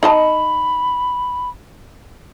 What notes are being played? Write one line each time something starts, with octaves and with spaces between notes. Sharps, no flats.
D#4 D#5 A5 B5